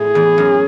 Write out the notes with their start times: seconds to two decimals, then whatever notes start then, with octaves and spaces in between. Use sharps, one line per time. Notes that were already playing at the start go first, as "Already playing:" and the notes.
Already playing: A2 G#4
0.15 E2
0.38 F#2